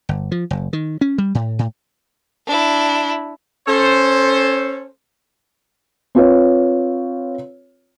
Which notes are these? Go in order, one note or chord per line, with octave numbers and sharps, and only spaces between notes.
G1
F3
F#1
D#3
C#4
G3
A2
A2
D4 E4
C#4 A4 C5
C4 F4 B4 C#5